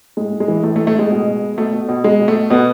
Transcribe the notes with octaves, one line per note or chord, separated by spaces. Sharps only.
A2 G#3
A2
G#3
E3
A2 A3
A3
A2
A3
A2 G#3
B2
B2
B2
B2 A3
B2
B2
B2 G#3
B2
A3
B2
B2 B3